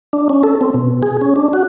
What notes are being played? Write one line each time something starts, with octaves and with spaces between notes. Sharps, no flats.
D4
C#4
A4
C4
B2
G#4
C#4
D4
F#4